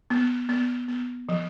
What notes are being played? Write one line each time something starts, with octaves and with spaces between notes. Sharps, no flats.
B3
B3
B3
F3